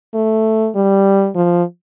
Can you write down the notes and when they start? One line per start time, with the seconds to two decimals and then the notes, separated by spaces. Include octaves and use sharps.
0.14 A3
0.75 G3
1.36 F3